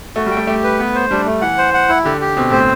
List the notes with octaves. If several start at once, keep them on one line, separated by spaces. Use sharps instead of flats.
A3 F#4
G3 G5
A3
A3 G4
B4
B3
C5
G3 D4
A3
E3 F#5
C5
F#5
E4
D3 G4
G4
B2 C4
A2 C5